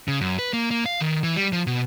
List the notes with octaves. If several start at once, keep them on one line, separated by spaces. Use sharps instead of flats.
C#3
F#2
B4
A#3
A#3
F5
D#3
E3
G3
F3
B2